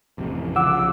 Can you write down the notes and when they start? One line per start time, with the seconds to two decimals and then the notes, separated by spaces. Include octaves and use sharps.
0.18 A1 F2 C3
0.56 C2 C#3 F3 F#5 D6 E6